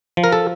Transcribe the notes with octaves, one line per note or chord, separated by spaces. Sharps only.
F3
A#4
A4